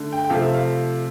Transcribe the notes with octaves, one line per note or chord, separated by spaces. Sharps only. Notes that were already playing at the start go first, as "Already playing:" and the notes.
Already playing: D3 A3
G5
G5
C3 F3 A3 F5
E5
F5